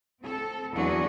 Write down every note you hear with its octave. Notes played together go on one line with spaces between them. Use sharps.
C4 A4
E2 F#3 D4 F#4 G#4